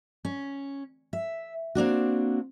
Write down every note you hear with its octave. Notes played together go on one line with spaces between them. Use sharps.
C#4
E5
A#3 C4 D4 F#4